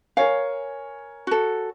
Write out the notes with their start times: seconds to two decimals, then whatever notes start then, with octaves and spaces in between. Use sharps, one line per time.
0.17 A#4 C#5 F5 G#5
1.27 F#4 A4